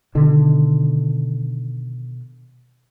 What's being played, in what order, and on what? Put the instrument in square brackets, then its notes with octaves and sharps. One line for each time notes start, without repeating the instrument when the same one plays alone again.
[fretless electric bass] B2 D3 D#3